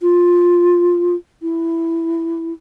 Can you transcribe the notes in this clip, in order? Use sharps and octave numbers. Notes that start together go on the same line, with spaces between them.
F4
E4